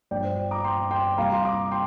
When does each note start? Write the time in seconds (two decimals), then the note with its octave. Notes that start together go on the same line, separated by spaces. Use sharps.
0.11 G1 G2 F3 D5 G5
0.24 C5
0.51 A#5 D6
0.64 G5 C6
0.91 G5 C6
1.18 C2 C3 G3 F5 A#5
1.33 C6
1.45 A#5 D6
1.71 G5 C6